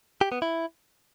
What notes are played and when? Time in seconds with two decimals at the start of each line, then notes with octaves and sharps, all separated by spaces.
0.21 G4
0.32 B3
0.42 E4